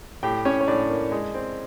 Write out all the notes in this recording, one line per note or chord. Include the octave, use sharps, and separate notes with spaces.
A2 G4 G5
A2 C#4 C#5
C#5
A2 D4 D5
A#3
G#3
C4